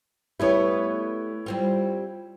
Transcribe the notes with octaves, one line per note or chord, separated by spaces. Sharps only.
G3 A3 B3 E4 C#5
G3 C4 F4